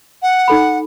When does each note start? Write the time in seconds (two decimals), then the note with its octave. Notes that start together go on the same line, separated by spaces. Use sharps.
0.22 F#5
0.48 D#4 A4 B5